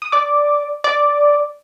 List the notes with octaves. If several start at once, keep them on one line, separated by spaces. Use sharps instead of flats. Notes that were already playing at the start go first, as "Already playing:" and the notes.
D#6
D5 D6
D5 D6